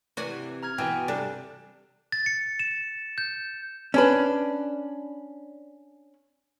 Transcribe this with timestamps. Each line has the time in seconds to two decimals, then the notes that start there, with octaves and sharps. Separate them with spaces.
0.17 C3 E3 F#4 D5 G#5
0.63 A#5 F6 G#6
0.78 B2 E3 G5 G#5
1.08 C3 G3 D4 A4
2.12 A6
2.26 C#7
2.59 E7
3.18 G6
3.94 C#4 D4 B4